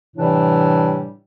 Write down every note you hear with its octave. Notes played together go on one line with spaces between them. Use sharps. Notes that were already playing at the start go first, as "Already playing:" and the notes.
A2 C3 E3 G3 D4